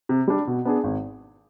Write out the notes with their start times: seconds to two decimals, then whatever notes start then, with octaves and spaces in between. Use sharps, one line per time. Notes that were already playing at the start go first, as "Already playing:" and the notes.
0.09 C3
0.28 G3 D4
0.47 B2
0.65 B3 D4 G#4
0.84 G#1